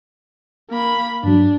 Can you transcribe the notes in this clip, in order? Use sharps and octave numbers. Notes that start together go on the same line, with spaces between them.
A#3 B5
G2 F#3 D4